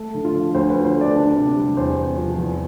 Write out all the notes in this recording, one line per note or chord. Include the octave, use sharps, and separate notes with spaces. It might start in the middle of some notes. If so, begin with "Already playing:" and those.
Already playing: A3
D3
F4
F3
D2 C5
B4
D3
C5
A3 D5
D4
C3
G3
E2 C5
C3
F3
E2